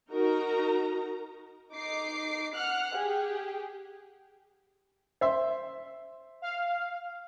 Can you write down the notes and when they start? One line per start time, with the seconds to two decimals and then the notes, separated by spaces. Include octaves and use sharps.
0.11 D#4 F#4 A#4 A#5
1.73 D#4 D6 C7
2.54 F#5 F6 F#6
2.94 G4 G#4
5.21 C5 E5 C6
6.42 F5